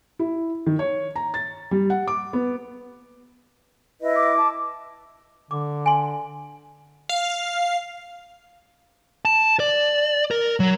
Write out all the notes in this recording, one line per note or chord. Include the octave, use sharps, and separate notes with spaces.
E4
D#3
C#5
A#5
A6
G3
F#5
D6
B3
E4 B4 D#5
D6
A5
D3 D6
G#5 C6
F5
A5
D5
A#4
F#3